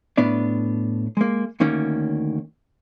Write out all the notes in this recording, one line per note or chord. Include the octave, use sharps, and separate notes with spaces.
A2 B3 D4 D5
G#3 A#3
D2 D#3 A#3 C#4